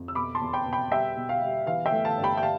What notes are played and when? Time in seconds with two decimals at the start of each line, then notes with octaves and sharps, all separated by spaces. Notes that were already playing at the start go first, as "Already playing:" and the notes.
Already playing: F2
0.08 E6
0.15 B2 B5 D6
0.35 A5 C6
0.41 E2
0.53 G5 B5
0.66 B2
0.73 G5 B5
0.91 G3 E5 G5
1.16 B2
1.29 F5
1.41 G3
1.66 E3 F5
1.86 E5 G5
1.92 A3
2.05 F5 A5
2.18 G2
2.24 G5 B5
2.37 G5
2.42 F5 A5